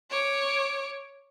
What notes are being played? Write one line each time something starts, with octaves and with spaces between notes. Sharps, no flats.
C#5 D6